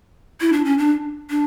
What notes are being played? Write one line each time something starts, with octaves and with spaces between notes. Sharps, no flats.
E4
D4
C#4
D4
D4